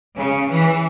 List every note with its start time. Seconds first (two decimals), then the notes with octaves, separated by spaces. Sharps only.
0.16 C#3
0.48 E3